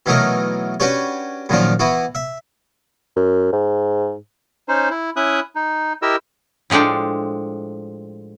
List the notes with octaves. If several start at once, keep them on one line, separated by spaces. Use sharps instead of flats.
B2 E3 F#3 A3 D#4 A#4
C#4 D4 F#4 G4 B4 C#5
F#2 A#2 D#3 F3 D4
E3 B3 E4 F#4
E5
F#2
G#2
C#4 D#4 C5
E4
C#4 E4 E5 D#6 F#6
D#4
E4 G4 A#4 D#5 E6
A2 F3 G#3 D4 G5